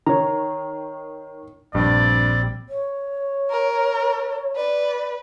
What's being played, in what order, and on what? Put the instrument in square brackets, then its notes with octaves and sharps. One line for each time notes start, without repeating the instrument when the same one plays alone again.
[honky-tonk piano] D#3 [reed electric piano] C#5 A#5
[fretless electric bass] A#1 [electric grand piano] G2 [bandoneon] G3 C4 [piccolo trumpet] D5
[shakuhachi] C#5
[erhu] A#4
[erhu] B4 [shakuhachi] D5